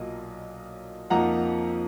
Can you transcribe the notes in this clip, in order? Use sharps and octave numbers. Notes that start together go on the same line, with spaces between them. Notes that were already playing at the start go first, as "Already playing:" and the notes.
Already playing: B1 A#2 F#3 A#3 D#5
F2 F3 A#3 D#4 F#5 A#5